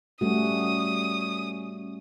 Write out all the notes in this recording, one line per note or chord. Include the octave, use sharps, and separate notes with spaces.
G3 A3 C#4 F#4 D#6